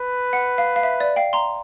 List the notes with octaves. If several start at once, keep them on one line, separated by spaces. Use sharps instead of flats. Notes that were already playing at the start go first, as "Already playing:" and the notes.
Already playing: B4
F#5
F5
F5
E5
D5
F5 G5
A#5 C6